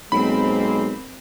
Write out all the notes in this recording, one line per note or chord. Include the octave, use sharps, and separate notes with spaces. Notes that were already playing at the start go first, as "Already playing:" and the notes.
B1 G#3 A#3 C4 B5